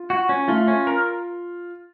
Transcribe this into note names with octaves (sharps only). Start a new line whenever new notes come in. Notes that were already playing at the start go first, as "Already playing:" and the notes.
Already playing: F4
F#4
C#4
A3 F4
C#4
A#4